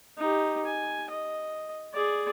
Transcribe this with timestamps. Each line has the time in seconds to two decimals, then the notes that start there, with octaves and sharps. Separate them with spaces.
0.18 D#4 G4
0.66 G#5
1.10 D#5
1.94 G#4 D5